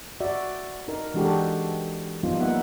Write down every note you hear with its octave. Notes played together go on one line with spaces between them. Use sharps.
F#4 D5 E5
D#4 A#4
E3 G#3 D4 F#4 G4 A4
F3 G3 B3 D#4 F4
F#3 A#3 B3 D#4 E5 F#5